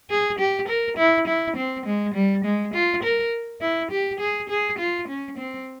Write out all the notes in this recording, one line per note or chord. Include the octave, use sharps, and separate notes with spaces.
G#4
G4
A#4
E4
E4
C4
G#3
G3
G#3
F4
A#4
E4
G4
G#4
G#4
F4
C#4
C4